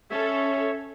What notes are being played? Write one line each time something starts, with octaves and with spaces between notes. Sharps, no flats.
C#4 A4 C#5 E5